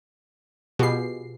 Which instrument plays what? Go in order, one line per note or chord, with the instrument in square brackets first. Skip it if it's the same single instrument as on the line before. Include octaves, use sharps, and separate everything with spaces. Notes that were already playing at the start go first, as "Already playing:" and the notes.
[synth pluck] B2 C7 [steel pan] F4 G4 G#4